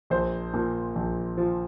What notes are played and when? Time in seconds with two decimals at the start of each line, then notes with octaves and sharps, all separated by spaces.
0.10 A#1 C5
0.54 A#2
0.95 A#1
1.37 F3